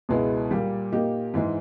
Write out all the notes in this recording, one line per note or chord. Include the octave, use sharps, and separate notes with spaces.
C#2 B2 G#3 B3 E4
A#2 G3 A#3
A#2 A#3 D#4 G4
G#2 E3 G#3